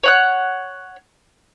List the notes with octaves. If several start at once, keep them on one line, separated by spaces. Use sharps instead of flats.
C#5 F#5 F#6